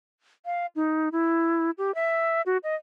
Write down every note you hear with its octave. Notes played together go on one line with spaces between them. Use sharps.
F5
D#4
E4
G4
E5
F#4
D#5